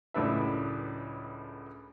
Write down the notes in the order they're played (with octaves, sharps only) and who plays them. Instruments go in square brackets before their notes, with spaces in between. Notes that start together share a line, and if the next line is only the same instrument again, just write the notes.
[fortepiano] C#2 F#2 A2 D4 B4 E5